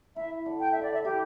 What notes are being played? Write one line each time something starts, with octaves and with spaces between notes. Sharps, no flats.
E4 E5
D3
G5
D3 E5
D5
E5
E4 G4